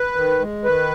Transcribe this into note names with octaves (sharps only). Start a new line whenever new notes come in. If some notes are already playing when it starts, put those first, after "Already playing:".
Already playing: B4
D#3
G#3
D#3 B4